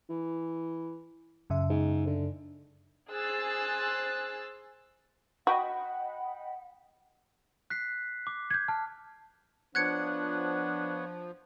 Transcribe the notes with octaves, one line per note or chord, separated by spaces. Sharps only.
E3
F#2 C#3 E5
G#2
D3
G#4 C5 E6 F#6 A6
F#4 D#5 F#5 G5 B5
F#6 B6 C7
D6
G6 G#6
A5 F6
F3 B3 D4 C#5 F#5 F#6 G#6 C#7